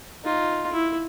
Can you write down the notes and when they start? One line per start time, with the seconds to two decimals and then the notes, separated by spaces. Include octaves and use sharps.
0.24 D#4 F4
0.72 E4